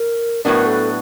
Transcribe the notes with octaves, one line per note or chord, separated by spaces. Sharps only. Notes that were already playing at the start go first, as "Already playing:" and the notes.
Already playing: A#4
A2 F#3 B3 D4 A#4
A4